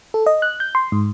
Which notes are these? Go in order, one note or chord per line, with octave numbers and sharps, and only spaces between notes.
A4
D#5
F#6
G6
C6
G#2